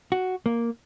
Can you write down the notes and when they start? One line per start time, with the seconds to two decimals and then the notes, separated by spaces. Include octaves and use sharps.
0.12 F#4
0.46 A#3